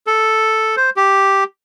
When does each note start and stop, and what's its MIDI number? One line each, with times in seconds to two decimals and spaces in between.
0.07 0.76 69
0.77 0.90 72
0.97 1.44 67